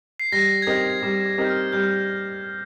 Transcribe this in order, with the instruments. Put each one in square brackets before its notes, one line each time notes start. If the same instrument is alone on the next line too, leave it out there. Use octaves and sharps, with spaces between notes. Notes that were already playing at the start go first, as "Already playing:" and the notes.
[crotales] C7
[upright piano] G3 [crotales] A#6
[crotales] G#6
[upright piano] C4 D#4 G4 A#4 [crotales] A#6
[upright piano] G3 [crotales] D6
[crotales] D6
[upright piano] C4 D#4 G4 A#4
[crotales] G6
F6
[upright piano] G3 [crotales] G6